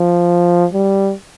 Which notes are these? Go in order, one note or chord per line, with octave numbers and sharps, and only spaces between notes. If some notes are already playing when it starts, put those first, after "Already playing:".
Already playing: F3
G3